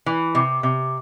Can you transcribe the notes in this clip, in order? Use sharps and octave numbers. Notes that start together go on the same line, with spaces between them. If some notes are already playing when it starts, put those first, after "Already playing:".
E3
C3
C3